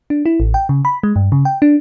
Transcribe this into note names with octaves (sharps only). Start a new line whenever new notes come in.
D4
E4
A1
G5
C#3
B5
G#3
G2
C#3
G5
D4